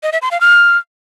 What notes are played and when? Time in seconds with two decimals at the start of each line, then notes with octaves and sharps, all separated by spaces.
0.03 D#5
0.12 E5
0.22 C6
0.31 F5
0.41 F6